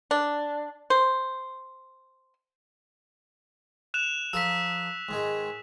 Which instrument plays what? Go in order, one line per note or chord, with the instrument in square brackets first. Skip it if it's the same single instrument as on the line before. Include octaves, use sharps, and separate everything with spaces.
[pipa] D4
C5
[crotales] F#6 E7 F7
[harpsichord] F3 A4 A#4 [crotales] E6 B6
[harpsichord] G#2 D#3 G#3